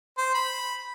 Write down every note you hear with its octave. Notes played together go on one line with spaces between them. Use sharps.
C5
B5